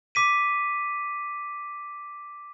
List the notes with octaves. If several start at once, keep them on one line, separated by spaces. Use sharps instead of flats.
D6 B6 D#7